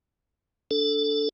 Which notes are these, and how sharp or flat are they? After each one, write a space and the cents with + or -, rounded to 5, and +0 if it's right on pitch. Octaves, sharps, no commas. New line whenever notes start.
D4 -15 A4 +0